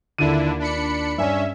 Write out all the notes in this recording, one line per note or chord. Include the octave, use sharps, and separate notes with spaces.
D#2 D3 D4 E4 F4 D#7
D4 B5 C#7
G2 C#4 D5 E5 G#5